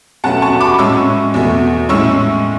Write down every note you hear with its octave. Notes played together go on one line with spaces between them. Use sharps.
B2 F#3 A3 C#4 F#5 A5
A5 C#6
B5 D6
A2 G#3 C#4 C#6 E6
E2 B2 A3
A2 G#3 C#4 E4 C#6 E6